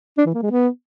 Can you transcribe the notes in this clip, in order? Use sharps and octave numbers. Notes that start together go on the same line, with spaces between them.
D4
E3
A#3
G#3
B3